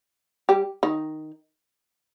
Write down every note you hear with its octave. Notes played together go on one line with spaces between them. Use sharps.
G3 G4
D#3 D#4